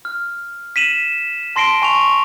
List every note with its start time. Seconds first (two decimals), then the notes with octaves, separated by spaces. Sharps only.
0.05 F6
0.76 B6 D#7 E7 F#7
1.56 A5 C6 A#6 C7 D7 G7
1.82 G#5 C#6 F7